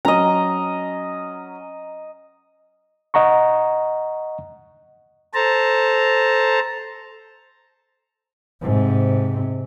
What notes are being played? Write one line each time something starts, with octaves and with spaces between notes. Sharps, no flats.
F#3 C#4 D#5 A#5
D#5 F#5 A#5 C#6
A4 C5 A5 A#5
G#2 C3